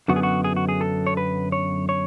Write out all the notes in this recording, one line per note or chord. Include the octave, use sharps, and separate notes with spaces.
F#2 D3 F#3 B3 F#4
G#4
F#4
G#4
F#4
G#4
A4
C#5
B4
C#5
C#5